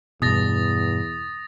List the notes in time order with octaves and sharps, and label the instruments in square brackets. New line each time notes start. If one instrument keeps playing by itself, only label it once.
[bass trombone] E2 [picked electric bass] G2 B2 [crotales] D#6 A6 A#6